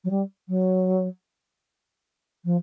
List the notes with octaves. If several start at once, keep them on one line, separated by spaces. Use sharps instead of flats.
F#3
G3
F#3
F3